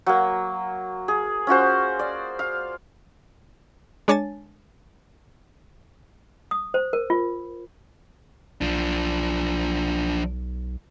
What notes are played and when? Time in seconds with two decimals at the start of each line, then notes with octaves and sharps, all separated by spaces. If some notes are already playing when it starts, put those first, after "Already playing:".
0.06 F#3 A#3
1.08 G#4
1.47 C#4 F4 F#4 C5
1.99 D5
2.39 F5
4.08 G#3 D4 C#5 G#5 A5 A6
6.51 D#6
6.74 C5
6.93 A#4
7.10 F4
8.61 B1 F3 D4